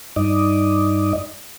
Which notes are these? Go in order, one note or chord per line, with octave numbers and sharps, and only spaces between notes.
G2 D#4 D5 D#5